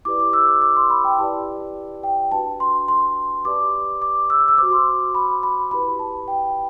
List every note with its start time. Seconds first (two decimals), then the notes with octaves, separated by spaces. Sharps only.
0.05 E4 G4 B4 D5 D6
0.20 D6
0.33 E6
0.48 D6
0.62 D6
0.76 C6
0.90 B5
1.04 G5
1.19 E4 G4 B4 D5 A5
2.03 G5
2.32 D4 F#4 B4 A5
2.60 C6
2.88 C6
3.45 G4 B4 D5 D6
4.02 D6
4.30 E6
4.48 E6
4.58 F#4 C5 D6
4.72 C6
5.15 B5
5.43 B5
5.71 E4 G4 B4 B5
5.99 A5
6.28 G5